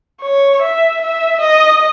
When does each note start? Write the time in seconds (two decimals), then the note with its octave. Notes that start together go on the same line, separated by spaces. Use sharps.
0.21 C#5
0.62 E5
1.02 E5
1.41 D#5